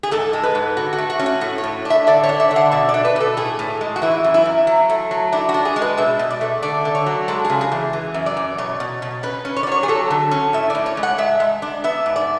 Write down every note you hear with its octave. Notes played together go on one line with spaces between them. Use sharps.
G#4
G#2 A4
G#3
B4
G#2
D3 F#4
F#4
A3
F#4
C#4
F#4
A2 F#4
C#5
A2
D4
E5
D3 D5
C#5
D4
E5
D3
F#5
B2 E5
D5
D4
B4
B2 A4
A2 G#4
A2
G#3
F#4
E3 E4
F#2
E4
F#2
F#3
A3
F#3
D4 E4
F#4
D4
G#4
G#3
B4
B2 E5
B2
D5
A3
D3 D5
D3
C#5
F#3
G#3 A4
C#3 G#4
G#4
E2
E3
F#2
D5
F#2
B2 C#5
B2
B2
C#4 B4
C#4
C#5
D5
F#3 C#5
G#4
F#3 A4
D3
C#4
A2 E5
A2 D5
C#5
G#3
F#5
G#3 E5
G#3
D4
B3 E5
G#2
D5